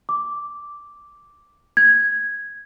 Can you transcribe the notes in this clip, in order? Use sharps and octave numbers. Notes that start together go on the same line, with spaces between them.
D6
G#6